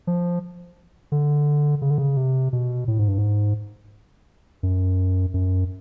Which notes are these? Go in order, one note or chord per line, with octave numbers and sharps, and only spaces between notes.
F3
D3
C#3
D3
C#3
C3
B2
A2
G#2
G2
G#2
F#2
F#2